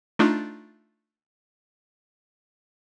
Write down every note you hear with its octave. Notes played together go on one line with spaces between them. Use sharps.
A3 D4 D#4 F4